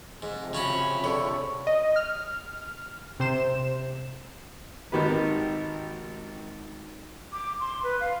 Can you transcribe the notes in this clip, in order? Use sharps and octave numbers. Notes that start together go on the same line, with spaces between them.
G#2 C3 F3
C#3 C#4 F#4 B5
D3 C#5
D#5
F6
C3 C5 E7
G#1 D#3 G4 B4
D6
C6
B4
F5